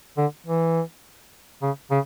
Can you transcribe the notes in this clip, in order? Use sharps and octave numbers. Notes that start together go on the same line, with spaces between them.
D3
E3
C#3
C#3